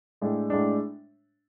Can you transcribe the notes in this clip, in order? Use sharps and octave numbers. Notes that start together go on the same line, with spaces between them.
A2 G#3 D4
A2 G#3 D4